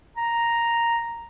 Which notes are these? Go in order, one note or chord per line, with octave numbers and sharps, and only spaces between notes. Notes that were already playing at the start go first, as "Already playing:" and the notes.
A#5